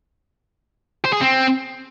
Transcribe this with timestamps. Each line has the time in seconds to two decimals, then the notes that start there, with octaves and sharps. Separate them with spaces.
1.05 C5
1.13 G#4
1.21 C4